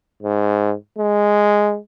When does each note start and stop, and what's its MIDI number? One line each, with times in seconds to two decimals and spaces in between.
0.23 0.74 44
0.99 1.78 56